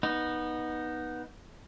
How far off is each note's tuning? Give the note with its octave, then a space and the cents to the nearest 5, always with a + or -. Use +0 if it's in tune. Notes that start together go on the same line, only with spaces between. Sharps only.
B3 -15 D#4 +0